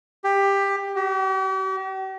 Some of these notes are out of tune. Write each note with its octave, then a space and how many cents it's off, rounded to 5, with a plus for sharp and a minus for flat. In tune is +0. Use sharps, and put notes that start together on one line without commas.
G4 +15
G4 -45